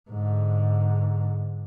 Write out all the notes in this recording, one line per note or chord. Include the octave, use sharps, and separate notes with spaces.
G#2 D3